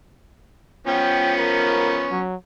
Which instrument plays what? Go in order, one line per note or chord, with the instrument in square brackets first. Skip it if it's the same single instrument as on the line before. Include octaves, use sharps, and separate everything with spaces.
[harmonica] F3 B3 C#4 [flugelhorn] G5
[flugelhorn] A#4
F#3